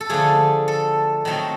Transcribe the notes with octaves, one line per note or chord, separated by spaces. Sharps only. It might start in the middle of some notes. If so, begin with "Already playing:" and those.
A4
D3 F3 A3 G#4
A4
D#3 F#3 A3 C4 D#4